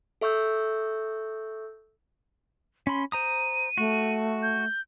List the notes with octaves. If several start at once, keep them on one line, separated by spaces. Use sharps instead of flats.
A4 E5 C#6 E6 G6
C#4 B5 C6
C5 A#5 D#6 D#7
A3 F#4
G6